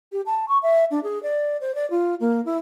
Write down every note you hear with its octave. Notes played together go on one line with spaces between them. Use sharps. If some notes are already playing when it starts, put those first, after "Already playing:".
G4
A5
C#6
E5
D4
G#4
D5
C5
D5
F4
A#3
E4